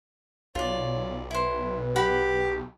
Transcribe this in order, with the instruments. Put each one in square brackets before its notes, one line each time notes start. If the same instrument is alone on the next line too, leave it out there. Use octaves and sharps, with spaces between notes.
[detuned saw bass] B1 [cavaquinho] F4 D5 [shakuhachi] C#5
[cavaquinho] E4 C5 [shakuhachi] B4
[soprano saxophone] G4 [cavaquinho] F#5 B5